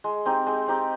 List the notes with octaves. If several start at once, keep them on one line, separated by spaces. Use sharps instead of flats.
G#3
C4 D#4 G4
G#3
C4 D#4 G4